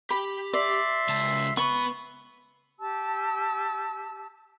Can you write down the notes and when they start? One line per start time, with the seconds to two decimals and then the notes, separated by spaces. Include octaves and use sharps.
0.10 G4 B5
0.53 D5 E5 C6
1.09 C#2 A5
1.57 B3 B5 C#6
2.79 G4 A5 E6